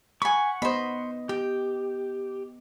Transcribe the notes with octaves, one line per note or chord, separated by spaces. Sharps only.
F#5 G#5 B5 C#6
B3 C5 D#5 B5
G4 G5